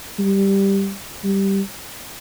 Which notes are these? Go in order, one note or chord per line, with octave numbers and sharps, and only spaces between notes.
G3
G3